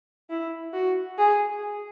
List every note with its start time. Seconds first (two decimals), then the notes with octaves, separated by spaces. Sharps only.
0.30 E4
0.73 F#4
1.18 G#4